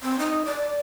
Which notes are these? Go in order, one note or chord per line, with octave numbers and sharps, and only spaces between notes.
C4
D#4
D5